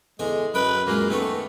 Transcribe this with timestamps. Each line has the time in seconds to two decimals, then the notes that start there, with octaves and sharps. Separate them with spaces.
0.19 E2 D3 G#3 G#5
0.54 F#2 B4 G5
0.87 F#2 A#2 G#3 A#3
1.10 D#3 A3 B3 C#4